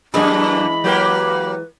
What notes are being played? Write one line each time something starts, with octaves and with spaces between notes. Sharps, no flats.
F#2 E3 G#3 A#3 D4 G#4 B5
F#3 A#3 G4 B4